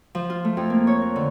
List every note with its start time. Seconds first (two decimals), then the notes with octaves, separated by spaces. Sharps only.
0.15 F3
0.30 F4
0.45 A3
0.57 F2
0.70 A#3
0.87 C#5
1.01 A#4
1.16 D3